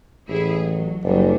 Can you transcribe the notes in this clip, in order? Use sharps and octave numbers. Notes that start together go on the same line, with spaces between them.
A1 E4 G#4
F#3
F#1 F#3 G3 D4